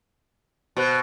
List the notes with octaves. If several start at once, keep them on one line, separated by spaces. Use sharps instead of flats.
B2 C5 F#6